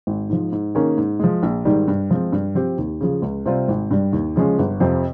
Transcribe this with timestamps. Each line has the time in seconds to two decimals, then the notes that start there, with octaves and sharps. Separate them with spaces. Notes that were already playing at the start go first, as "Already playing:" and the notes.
0.07 G#1
0.30 G#2 F3
0.52 G#2
0.75 D#3 A#3 C#4 G#4
0.98 G#2
1.20 F3 G#3
1.43 A#1
1.65 G#2 D#3 G3
1.88 G2
2.11 F3 G#3 C4
2.32 G2
2.55 F3 C4 G4
2.78 D#2
3.01 C#3 F3
3.22 C#2
3.46 C3 G3 C4 F4
3.68 G#1
3.91 G2 G3
4.13 D#2
4.36 C#3 F3 G#3 C#4
4.59 G1
4.80 F2 C3 F3 C4